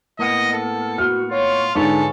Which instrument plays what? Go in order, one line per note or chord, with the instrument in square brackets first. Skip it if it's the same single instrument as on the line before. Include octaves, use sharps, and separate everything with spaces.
[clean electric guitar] A2 A#3 B3 [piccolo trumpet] D#5
[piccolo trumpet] A4
[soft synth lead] F#4 [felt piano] F6
[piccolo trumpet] F4 [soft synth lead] C#5
[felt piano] G#2 D3 [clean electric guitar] F4 B4 C#5 [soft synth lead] G#4 [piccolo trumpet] A4